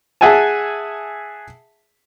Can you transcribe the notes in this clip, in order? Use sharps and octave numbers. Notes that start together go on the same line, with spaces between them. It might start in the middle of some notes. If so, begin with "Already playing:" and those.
G#4 E5 F#5 G#5 A5